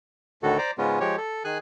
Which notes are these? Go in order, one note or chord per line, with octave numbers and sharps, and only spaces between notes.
D2 A2 D3 D#3 F#4 A4
C5 D5 A#5 D6
G#2 C#3 G#3 B3 C#4 F4
F3 G#3 G4 C#5
A4
D#3 G#4 G#5 F#6